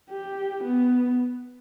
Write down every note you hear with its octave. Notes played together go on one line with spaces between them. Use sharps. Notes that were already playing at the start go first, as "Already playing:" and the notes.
G4
B3